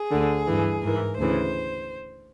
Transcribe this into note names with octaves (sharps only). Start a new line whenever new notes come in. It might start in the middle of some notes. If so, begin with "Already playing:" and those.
Already playing: G#4
D2 D3
G2 E3
G#2 E3 A#4
D2 C#3 E3 C5